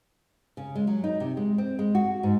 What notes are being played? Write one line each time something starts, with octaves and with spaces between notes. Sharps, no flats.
C#3
G#3
F#3
D#4
C3
G#3
C4
G#3
F#4
G#2